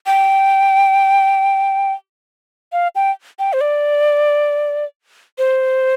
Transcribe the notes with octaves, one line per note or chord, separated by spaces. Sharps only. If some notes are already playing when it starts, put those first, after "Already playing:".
G5
F5
G5
G5
C5
D5
C5